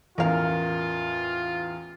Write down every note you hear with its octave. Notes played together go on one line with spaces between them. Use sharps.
A1 E2 F4 A#4 F5